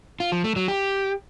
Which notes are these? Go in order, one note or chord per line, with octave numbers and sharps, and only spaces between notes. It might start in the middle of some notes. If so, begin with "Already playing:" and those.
F4
F3
A3
F#3
G4